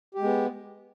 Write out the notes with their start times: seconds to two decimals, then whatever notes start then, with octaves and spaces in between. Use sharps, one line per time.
0.15 G4
0.19 G#3
0.23 B3